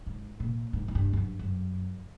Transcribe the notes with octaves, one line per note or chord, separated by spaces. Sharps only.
G#2
A#2
G#2
G#2
G2
F#2
G2
F#2